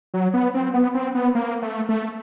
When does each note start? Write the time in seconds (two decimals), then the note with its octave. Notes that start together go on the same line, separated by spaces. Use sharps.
0.14 F#3
0.34 B3
0.54 C4
0.74 B3
0.94 C4
1.15 B3
1.35 A#3
1.62 A3
1.89 A3